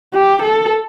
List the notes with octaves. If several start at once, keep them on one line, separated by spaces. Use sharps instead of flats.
G4
A4